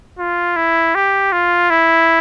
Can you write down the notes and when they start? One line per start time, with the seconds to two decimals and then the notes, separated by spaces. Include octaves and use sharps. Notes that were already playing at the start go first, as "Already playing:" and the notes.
0.19 F4
0.56 E4
0.95 G4
1.32 F4
1.70 E4